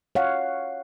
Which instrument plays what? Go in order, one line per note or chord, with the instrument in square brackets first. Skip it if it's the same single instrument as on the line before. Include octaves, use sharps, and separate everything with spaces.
[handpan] C#5 F5 F#5